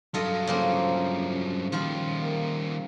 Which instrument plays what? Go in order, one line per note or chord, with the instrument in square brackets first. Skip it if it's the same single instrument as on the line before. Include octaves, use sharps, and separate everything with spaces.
[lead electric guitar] G2 F#3 [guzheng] F4 A4 D#5
[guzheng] C#3 A#3 C4 [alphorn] F3
[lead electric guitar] D#3 G3 [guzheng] F3 F4 B5
[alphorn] A#3